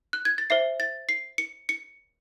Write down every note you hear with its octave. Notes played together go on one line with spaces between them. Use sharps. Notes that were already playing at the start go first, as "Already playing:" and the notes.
F#6
G#6
A6
C5 E5 C7
A6
C7
C#7
C#7